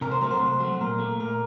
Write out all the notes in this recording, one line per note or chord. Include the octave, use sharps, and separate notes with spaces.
C3 A#4
C5
F#3 A3 A#4
C5
C3
F#3 A3
A#2 A#4
A3
A#2 A#4